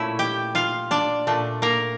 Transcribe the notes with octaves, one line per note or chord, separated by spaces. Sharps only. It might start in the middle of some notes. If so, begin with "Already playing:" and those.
Already playing: A#2 A3 C#4 E4 E5
G4 G5
F4 F5
D4 D5
A#2 A3 D4
A#3 A#4